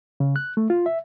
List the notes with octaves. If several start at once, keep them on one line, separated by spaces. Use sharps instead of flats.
C#3
F#6
A3
F4
E5